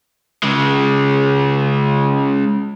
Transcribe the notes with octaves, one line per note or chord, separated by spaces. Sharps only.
C#3 G#3